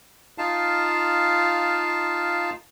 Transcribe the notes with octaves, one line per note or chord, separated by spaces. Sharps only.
D#4 F4 F5 A5